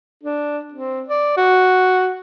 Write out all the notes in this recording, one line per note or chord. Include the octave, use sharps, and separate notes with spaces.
D4
C4
D5
F#4